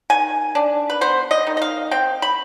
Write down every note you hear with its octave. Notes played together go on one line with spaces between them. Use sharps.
D#3 G#5
D4
B4
B3 C5
D#5
D#3
D#5
F5
C4 G5
B5